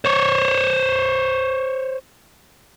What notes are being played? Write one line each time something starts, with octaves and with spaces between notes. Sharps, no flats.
C5 C#5